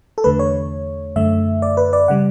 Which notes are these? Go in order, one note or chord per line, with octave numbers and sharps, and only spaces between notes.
A4
E2 D3 A3 B4
C#5
F#2 D3 A3 E5
D5
B4
D5
C#3 G3 F#5